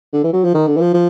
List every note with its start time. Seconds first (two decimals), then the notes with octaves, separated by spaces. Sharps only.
0.13 D3
0.24 E3
0.33 F#3
0.44 F3
0.54 D#3
0.67 D3
0.77 E3
0.81 F3
0.94 F3